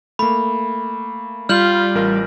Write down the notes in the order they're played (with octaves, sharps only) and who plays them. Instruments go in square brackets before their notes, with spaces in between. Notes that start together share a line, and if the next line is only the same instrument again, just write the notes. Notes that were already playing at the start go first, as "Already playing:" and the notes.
[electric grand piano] A3 A#3 [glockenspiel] B5
[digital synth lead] G3 [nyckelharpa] F4 [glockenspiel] F6 G6 F#7
[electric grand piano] A1 A#4